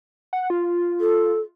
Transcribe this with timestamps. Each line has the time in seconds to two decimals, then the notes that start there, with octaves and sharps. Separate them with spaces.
0.33 F#5
0.50 F4
1.00 A4